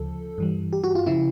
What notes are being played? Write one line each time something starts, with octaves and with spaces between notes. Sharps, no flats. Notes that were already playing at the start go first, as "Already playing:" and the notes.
Already playing: D2 C#3 F3 A4
G2 E3 G3
G4
F#4
F4
C#3 F3 E4